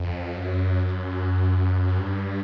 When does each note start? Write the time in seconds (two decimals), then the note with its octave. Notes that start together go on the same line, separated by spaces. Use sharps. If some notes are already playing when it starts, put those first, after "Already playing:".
Already playing: F2
0.36 F#2
1.98 G2